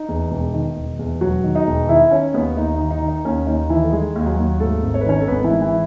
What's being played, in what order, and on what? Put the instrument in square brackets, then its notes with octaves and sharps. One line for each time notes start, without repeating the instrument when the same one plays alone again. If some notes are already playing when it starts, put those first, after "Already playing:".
Already playing: [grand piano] D#4
E2
E1
D#3
E1
E2
E1 F#3 F#4
D#3
D#4 D#5
E1
D#3 E4 E5
D#3 C#4 C#5
D#2 B3 B4
D#2 D#4
D#4
D#3
D#4
D#3
D#4
D#2 C#4
D#2 D#4
D#3 E3 E4
A4
D#3 G#3 G#4
D#2
F#3 F#4
D#2
G#2 A3 A4
G#1
C#5
B4
D#3 C#4 C#5
A4
G#1 B3 B4
E3 E4
G#2
E3 E4